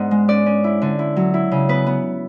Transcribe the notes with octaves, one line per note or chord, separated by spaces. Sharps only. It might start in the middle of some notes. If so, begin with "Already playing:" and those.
Already playing: G#2 B3 D4 F#5
G#3
C#4 D5
C#4
E4
D3
E4
F#3
E4
C#3
B3 B4
B3